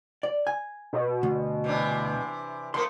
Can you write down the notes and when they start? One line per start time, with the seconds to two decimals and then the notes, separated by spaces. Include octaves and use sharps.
0.23 D5
0.47 G#5
0.93 B2
1.23 D2
1.64 C3 E3 D4
2.74 F3 A3 A#3 C6